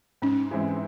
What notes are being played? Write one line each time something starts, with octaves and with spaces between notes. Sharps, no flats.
G#2 C#4
E3 G#3 C4 E4